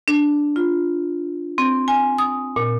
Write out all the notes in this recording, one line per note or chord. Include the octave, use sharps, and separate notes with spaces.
D4
F4
C4
G#5
D#6
A#2